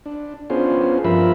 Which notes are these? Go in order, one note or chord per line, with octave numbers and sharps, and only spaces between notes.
D4
B3 C#4 D4 F4 G#4 C5
G2 F3 F4 A#4 E5 B5